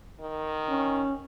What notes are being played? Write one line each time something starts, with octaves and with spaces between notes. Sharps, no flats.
D#3
C#4